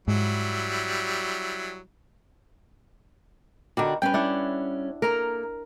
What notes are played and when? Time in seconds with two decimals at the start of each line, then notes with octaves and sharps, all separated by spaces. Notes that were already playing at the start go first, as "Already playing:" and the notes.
0.08 G#2 F#3 G3 E4
3.77 D3 D#3 G3 D4 F#4
4.02 G3 C#4 B4 G5
4.14 D4 E4 F#5
5.02 A#3 A4 A#4 A#5